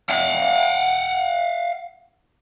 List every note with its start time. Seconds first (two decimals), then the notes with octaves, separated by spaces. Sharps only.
0.10 F5 F#5